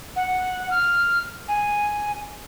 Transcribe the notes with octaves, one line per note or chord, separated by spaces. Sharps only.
F#5
F6
G#5